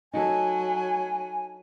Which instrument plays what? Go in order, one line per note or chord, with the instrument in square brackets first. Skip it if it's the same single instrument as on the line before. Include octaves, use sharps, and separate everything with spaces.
[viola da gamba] F#3 [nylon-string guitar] D#4 A4 [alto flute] G#5